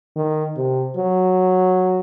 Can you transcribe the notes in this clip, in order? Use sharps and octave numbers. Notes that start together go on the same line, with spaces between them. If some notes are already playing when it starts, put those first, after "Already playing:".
D#3
C3
F#3